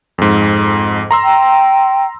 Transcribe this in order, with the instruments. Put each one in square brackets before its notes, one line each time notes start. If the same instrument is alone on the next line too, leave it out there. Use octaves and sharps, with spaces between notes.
[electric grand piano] F2 G#2
A#5 C6 E6
[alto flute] G5